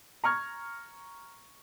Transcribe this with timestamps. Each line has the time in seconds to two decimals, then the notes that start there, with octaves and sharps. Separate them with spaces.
0.24 A#5 C#6 F6 G#6